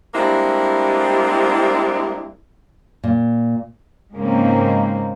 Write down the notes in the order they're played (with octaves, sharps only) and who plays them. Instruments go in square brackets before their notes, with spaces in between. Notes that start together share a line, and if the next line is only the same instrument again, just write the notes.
[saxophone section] G3 G#3 A#3 C4 D4 E4
[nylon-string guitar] A#2
[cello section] G#2 C#3 G#3 A#3 C4